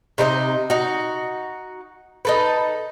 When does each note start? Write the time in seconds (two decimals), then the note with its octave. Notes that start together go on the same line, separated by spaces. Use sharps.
0.18 C3 D#4 A#4 D#5
0.70 D#4 F#4
2.25 D#4 A4 B4